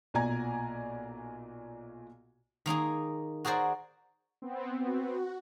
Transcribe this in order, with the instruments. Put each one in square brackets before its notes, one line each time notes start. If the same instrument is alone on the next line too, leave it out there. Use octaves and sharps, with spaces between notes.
[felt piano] B1 A#2 D5 G#5 A#5 G#6
[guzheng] D#3 A#3 D#4 G#4
F#4 G#4 A#4 C5 D5
[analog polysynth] B3 C4
[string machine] F#4